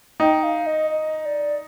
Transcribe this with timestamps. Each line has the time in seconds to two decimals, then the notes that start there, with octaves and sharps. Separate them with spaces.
0.20 D#4 G5
0.43 F5
0.66 D#5
0.90 D#5
1.25 D5